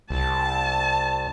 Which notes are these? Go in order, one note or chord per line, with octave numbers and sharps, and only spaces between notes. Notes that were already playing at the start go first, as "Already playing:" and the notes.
C2 A5